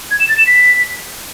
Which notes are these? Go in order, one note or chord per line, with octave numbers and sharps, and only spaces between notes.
G#6
E7
A6
E7
B6